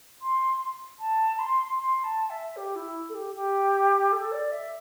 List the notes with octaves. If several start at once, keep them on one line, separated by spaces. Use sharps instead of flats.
C6
A5
C6
C6
A5
E5
G4
E4
A4
G4
G4
A4
D5
E5